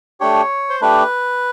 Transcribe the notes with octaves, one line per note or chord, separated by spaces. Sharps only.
A3 D4 G4 C#5
C5
A3 D4 G4 B4